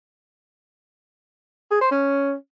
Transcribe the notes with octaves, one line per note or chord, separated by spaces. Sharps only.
G#4
C5
C#4